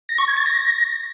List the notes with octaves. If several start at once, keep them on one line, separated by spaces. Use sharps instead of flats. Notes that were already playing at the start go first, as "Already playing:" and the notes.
A#6
C#6
G#6
A6
A#6